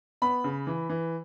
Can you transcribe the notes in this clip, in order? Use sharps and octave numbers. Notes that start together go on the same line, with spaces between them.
B3 B5
C#3
E3
E3